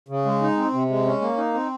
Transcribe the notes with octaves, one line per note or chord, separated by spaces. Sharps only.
C#3
G#3
D#4
C4
C3
G#3
C#4
A#3
D#4
C4